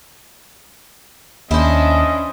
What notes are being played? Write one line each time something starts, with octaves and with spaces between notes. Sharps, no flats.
D#2 C#4 D4 E4 C5 D#5